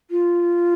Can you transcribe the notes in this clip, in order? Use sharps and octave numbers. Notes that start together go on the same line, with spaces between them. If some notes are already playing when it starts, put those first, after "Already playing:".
F4